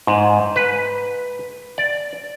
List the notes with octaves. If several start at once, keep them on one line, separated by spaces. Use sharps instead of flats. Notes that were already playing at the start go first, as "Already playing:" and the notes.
G#2
B4
D5